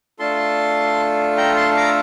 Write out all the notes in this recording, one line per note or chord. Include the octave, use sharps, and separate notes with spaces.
A3 D4 F4 A4 A5 C6
G5 A#5
A5 C6
A#5 D6